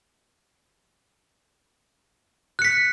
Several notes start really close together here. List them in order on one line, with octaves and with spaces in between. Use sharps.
F#6 C#7 B6